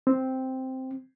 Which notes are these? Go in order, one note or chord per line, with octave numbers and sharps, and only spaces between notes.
C4